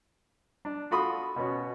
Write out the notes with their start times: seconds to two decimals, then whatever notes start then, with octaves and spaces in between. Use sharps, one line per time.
0.65 D4
0.91 F4 F#4 A4 B5 C6 D#6
1.36 B2 B3 C#4 F#4